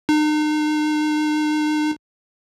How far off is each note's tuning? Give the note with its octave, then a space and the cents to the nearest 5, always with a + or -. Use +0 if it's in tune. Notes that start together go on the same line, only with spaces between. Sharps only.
D#4 -40